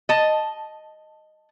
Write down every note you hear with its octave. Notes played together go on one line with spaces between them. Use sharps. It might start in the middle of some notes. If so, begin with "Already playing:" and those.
D#5 A5